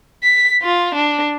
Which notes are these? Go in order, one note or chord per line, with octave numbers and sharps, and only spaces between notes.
B6
F4
D4